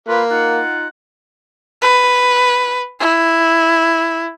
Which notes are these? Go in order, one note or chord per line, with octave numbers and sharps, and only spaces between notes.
A#3 F4 B4
D#4 F4 F#5
B4
E4